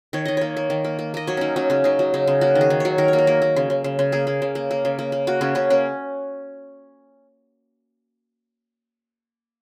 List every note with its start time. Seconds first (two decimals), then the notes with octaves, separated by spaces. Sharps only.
0.13 D#3 C#5
0.25 D#3 D#5
0.37 A#3 C#5
0.57 A#3
0.70 D#3
0.84 A#3
0.99 A#3
1.14 A#3 D#5
1.27 F#3 C#5
1.37 A#3 C#4 D#4
1.56 F#3 C#4
1.70 C#3 C#4
1.84 C#3 D#4
1.99 F#3
2.14 C#3 D#4
2.27 C#3
2.41 A#3 F#4
2.55 D#3
2.61 G#4
2.70 D#3
2.80 F#3 C#5
2.98 D#3 A#4
3.08 A#3 C#5
3.18 A#4
3.27 A#3
3.42 A#3
3.56 C#3
3.70 C#3
3.84 C#3
3.99 C#3
4.12 A#3 G#4
4.27 A#3
4.42 C#3
4.55 A#3
4.71 A#3
4.85 C#3
4.99 A#3
5.12 A#3
5.27 A#3 F#4
5.41 C#3 C#4
5.55 C#3 C#4
5.70 A#3 C#4